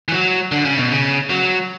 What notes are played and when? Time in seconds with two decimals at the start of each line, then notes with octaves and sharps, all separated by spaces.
0.08 E3
0.12 F#3
0.52 D3
0.65 C#3
0.78 B2
0.91 C#3
1.30 F#3